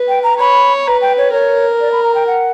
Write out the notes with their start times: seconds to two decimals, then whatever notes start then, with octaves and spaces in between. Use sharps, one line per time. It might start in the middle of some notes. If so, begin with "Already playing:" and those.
Already playing: B4
0.08 G5
0.23 A#5
0.40 C#5 B5
0.86 B4 A#5
1.02 G5
1.18 C#5
1.33 A#4 C#5
1.81 D5
1.92 B5
2.03 A#5
2.15 G5
2.27 F#5